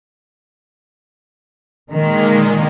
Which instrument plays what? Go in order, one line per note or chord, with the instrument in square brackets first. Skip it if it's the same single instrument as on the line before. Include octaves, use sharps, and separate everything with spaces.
[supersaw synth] A#2 G#3 A#3 [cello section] D#3